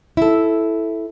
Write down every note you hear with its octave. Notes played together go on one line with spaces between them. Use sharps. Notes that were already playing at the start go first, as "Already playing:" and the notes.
E4 A4